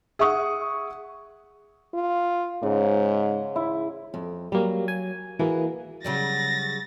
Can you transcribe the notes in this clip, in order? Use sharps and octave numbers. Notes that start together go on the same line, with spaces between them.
G#4 E5 F#5 C#6 D#6
F4
G#2 C#3
E4
F2
F#3 G3 A#3
G#5
E3 A#3 F#4 G#4 B4
C#3 F#3 G3 A6 A#6